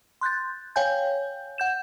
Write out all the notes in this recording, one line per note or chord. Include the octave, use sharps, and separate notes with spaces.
C6 F#6 G6 A6
C#5 F5 G5 G#5 G6
F#5 G6 E7